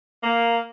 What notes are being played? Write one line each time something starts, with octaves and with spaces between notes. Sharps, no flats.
A#3